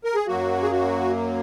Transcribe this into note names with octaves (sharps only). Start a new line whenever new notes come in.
A#4
G#4
F#2 F#3 A#3 F#4
G#4
F#4